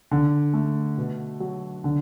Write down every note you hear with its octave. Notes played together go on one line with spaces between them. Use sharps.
D3
A3
B2
F#3
D3